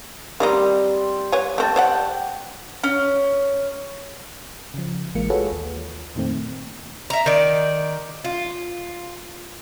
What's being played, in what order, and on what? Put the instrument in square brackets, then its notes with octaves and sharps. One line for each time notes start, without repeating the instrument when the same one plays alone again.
[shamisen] D#3 A#3 D#4 [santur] G3 C4
[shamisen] B4 C#5 G#5
[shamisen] A3 C4 [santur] G5 A5
[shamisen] C5 D5 F#5
[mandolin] C#4
[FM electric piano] C#3 F3
A1 E3 G#3 A#3 C#7
F4 F#4 G#4 A4 B4 C#5
D#2
F2 A#2 D#3 A3 C4
[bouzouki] E5 A#5
D#3 D5
F4